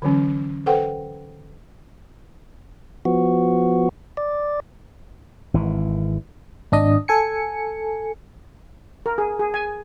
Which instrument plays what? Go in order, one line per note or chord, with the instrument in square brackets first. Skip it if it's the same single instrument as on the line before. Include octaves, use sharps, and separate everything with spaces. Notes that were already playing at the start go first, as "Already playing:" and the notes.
[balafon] D3 E3 F#3 C#4
A4 B4 C5 F#5 G5
[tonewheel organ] F3 B3 F#4
D5
[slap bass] G#1 E3
[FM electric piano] G#1 D4 D#5
A4 G#5 C#7
[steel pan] A#4
G#4
G#4
G#5